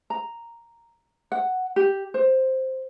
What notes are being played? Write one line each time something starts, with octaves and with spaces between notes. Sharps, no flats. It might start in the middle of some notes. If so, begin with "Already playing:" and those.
A#5
F#5
G4
C5